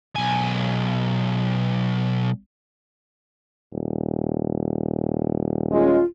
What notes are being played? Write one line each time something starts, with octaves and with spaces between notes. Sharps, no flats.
B1 G#5
D#1
G#3 C#4 F4